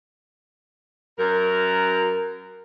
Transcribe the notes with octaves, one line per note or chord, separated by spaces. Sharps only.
F#2 A#4